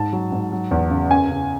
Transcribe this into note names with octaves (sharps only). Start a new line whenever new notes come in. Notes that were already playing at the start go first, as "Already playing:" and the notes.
Already playing: G#2 A5
F#3
G#2
F#3
E2
C#3
F#2 G#5
C#3